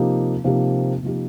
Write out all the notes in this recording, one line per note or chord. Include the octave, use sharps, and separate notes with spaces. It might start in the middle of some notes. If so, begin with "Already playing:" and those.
Already playing: C3 F3 A#3 D#4 G4
C3 F3 A#3 D#4 G4
C3 F3 A#3 D#4 G4